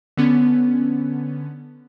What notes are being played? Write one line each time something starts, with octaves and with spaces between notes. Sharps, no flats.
D3 B3 C#4